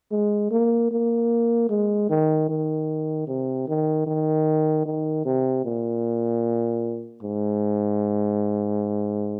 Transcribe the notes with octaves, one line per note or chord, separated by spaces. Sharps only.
G#3
A#3
A#3
G#3
D#3
D#3
C3
D#3
D#3
D#3
C3
A#2
G#2